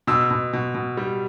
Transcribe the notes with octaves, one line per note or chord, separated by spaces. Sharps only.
B2 E6
B2
B2
B2
G3